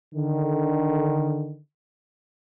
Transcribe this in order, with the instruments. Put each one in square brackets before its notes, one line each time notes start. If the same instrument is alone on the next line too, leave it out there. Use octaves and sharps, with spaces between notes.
[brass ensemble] D3 D#3